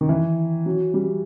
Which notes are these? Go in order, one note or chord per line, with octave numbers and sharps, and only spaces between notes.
D#3
E3
F#3
G3